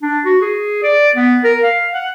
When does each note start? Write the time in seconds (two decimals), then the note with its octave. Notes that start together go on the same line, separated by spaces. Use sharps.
0.02 D4
0.25 F#4
0.42 G#4
0.83 D5
1.16 B3
1.44 A#4
1.64 F5
1.94 F#5